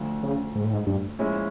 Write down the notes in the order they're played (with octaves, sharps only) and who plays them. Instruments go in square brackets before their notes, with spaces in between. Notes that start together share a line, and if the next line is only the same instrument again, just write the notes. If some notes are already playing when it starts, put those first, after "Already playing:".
Already playing: [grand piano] D2 D3 F3
[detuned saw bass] C#3
G#2
A2
G#2
G2
[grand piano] A#2 F3 G#3 C#4 E4